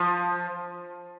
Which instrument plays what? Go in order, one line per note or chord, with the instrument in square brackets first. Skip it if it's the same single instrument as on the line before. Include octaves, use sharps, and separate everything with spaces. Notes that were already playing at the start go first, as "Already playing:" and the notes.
Already playing: [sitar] F3